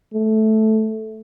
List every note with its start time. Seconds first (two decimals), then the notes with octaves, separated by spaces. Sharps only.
0.13 A3